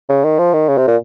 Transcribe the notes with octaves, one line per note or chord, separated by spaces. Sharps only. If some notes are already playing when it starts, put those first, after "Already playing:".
C#3
D#3
F3
D#3
C#3
C3
A#2